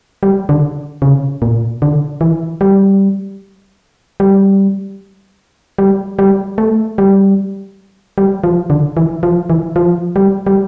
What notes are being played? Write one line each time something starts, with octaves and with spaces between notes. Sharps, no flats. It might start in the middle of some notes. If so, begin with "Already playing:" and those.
G3
D3
C#3
A#2
D3
E3
G3
G3
G3
G3
A3
G3
G3
F3
D3
E3
F3
E3
F3
G3
G3